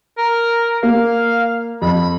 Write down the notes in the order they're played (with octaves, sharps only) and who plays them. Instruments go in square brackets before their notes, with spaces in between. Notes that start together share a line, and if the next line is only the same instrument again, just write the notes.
[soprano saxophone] A#4
[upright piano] A#3 [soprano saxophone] F5
[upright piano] F2 [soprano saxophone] B5